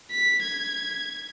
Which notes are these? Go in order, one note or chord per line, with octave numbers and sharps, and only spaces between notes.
B6
G#6